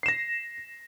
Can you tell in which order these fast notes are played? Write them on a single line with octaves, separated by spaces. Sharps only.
C7 E7 A#6